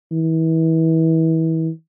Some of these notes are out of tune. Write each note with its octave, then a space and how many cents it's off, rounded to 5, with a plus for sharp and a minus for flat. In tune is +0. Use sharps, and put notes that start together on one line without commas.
E3 -30